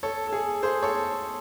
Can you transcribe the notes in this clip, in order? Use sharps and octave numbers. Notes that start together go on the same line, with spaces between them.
A4 C#5
A4
G#4
G#4 C5
A4 C#5